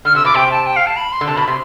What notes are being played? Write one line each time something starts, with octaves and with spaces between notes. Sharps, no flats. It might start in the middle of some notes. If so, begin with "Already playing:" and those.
D3 F6
C3 E6
B2 D6
C3 G5
A5
G5
F5
A5
B5
C6
D3
C3 A5
B2 B5
C3 C6